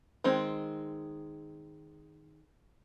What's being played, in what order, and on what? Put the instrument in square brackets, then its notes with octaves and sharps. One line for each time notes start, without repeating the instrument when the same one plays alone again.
[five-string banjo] D#3 G#3 C4